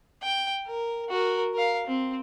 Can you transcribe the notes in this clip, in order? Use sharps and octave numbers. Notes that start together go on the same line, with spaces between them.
G5
A#4
F#4 A#4
A#4 F5
C4